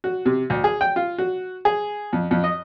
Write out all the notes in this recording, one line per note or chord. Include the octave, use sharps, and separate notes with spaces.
F#4
C3
D2
G#4
G5
F4
F#4
G#4
F2
F2
D#5